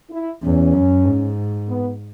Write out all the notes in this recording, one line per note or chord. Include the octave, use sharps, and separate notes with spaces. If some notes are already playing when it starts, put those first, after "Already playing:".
E4
E2 C#4
F#2
G#2
B3